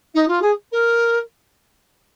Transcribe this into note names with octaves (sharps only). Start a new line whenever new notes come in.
D#4
F4
G#4
A#4